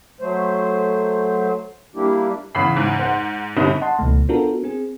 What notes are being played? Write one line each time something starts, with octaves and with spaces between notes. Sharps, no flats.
F#3 A3 C5
G3 A#3 D4 E4 G4
E2 C#3 B5 C7
G#2
C5 F#5
G1 G2 C3 D#4
D#5 F#5 A5 C6
C#2 B2 D#3 A3
B3 D4 F4 F#4 A4 A#4
C4 G#4